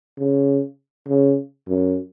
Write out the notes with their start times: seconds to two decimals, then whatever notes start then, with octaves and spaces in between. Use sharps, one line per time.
0.18 C#3
1.08 C#3
1.68 F#2